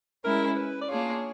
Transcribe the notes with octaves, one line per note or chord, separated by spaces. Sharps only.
G#3 C#4 E4 A#4
B4
D5
A#3 D4 F4 G#4 C#5